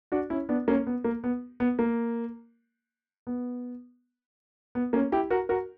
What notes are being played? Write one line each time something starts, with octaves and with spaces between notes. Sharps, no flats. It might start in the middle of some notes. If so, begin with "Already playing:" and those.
D4 F#4
C#4 E4
B3 D4
A#3 C#4
B3
A#3
B3
B3
A#3
B3
B3
A#3 C#4
E4 G4
F#4 A#4
F#4 A#4